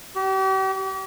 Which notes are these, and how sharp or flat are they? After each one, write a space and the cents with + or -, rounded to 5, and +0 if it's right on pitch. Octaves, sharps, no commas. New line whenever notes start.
G4 -40